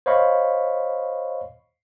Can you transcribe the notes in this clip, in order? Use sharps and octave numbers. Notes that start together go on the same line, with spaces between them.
C5 C#5 D#5 F5 B5 C#6